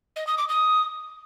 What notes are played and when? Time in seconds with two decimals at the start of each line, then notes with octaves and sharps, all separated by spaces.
0.16 D#5
0.27 D#6
0.38 D6
0.49 D#6